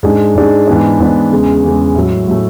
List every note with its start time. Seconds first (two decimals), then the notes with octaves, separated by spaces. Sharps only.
0.03 G#2 G#3 D4 G#4
0.35 G#2 G#3 D4 G#4
0.67 G#2 E3 B3 D4
0.99 G#2 E3 B3 D4
1.31 E2 C#3 G#3
1.64 E2 C#3 G#3
1.95 A2 F#3 A3
2.28 A2 F#3 A3